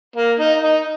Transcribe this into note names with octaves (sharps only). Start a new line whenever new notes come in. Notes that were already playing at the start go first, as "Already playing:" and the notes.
A#3
D#4
D#4